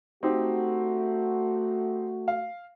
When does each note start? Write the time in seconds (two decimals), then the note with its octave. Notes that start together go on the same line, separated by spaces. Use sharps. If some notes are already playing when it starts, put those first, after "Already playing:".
0.23 A3 C4 D#4 F#4 G4
2.28 F5